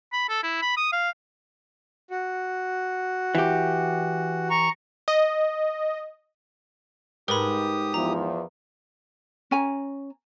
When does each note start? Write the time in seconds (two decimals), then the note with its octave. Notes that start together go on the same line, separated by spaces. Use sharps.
0.13 B5
0.29 A4
0.43 E4
0.62 B5
0.77 D#6
0.93 F5
2.10 F#4
3.35 E3 G4
4.50 A#5 C#6
5.08 D#5
7.28 G#2 G4 A#4 B4 B5 D#6
7.94 E2 F3 A#5
9.51 C#4 G#5 A#5